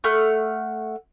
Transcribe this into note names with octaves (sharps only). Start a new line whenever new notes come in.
A3 F#5 F6